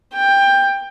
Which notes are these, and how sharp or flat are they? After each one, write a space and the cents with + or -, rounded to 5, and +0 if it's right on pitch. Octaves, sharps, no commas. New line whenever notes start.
G5 +15